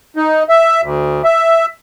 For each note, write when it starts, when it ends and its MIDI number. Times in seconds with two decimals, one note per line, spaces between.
0.16 0.43 63
0.49 0.81 76
0.82 1.22 38
1.24 1.66 76